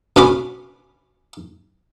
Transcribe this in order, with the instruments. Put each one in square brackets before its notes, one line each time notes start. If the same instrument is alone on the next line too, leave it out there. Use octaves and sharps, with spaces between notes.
[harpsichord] B2 C#4 B5 D6